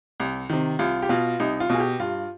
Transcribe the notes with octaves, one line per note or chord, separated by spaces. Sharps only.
C2
C3 D#3
C2 F4
G4
B2 F4
C2 D#4
F4
B2 G#4
G4
G2 F4